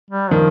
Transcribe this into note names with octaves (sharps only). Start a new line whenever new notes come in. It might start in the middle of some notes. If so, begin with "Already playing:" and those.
G3
D#3 F3